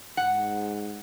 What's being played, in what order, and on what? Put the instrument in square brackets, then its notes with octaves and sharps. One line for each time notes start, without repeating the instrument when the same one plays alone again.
[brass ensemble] G#2 [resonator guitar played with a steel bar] F#5